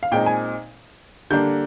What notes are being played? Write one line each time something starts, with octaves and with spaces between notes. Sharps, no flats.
F5
A#2 G#3 C4 D#4 G5
G#5
D3 G3 A#3 D4 G6